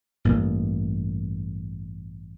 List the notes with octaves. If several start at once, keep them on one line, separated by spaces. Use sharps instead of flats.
A1 G2 A#3